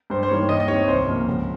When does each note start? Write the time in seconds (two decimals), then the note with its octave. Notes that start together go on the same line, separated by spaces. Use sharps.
0.10 G2 C5
0.23 C5
0.29 D#3 G3 A#3 C#5
0.49 D#2 D#5
0.60 D#5
0.68 D#3 G3 C4 C#5
0.88 C2 C5
1.07 A#2 F3 A#3 C#4
1.27 C#2